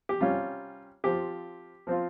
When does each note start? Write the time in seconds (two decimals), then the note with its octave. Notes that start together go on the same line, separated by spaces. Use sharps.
0.09 G4
0.20 C3 G3 C#4 F4
1.04 F3 C4 F4 G4
1.87 F3 C4 F4